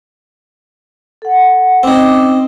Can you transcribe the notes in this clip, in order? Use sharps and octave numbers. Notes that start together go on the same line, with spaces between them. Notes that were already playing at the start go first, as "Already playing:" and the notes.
A4 F#5
C4 C#4 D#4 D6 E6